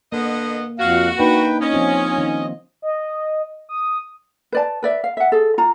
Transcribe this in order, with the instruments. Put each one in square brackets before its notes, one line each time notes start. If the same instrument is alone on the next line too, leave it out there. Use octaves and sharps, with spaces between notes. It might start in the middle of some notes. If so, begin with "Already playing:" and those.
[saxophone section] D3 B3 D#5 [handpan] A#3
[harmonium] F2 F5 [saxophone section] F#4
[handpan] A#3 D4 D#4 [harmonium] B4 G5
[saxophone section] C#4 [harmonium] D#5
[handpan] F3 C4 F4
D#3
[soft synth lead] D#5
D#6
[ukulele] B4 D5 A5
B4 D5 E5
F5
E5 F#5
G#4 A4
F4 A#5